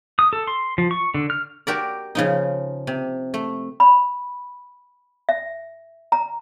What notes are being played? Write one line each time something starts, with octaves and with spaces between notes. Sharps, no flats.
D#6
A4
C6
F3
C#6
D3
F6
F#4 G4 A#4 D5
C#3 F3 D#4
C3
A3
B5
E5
A#5